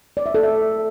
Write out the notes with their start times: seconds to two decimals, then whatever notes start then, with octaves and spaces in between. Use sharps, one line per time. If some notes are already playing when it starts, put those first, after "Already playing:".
0.17 D5
0.26 E5
0.35 A4
0.43 E5